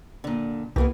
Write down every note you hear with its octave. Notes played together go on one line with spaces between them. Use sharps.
A#2 D3
C2 E3 A#3 B3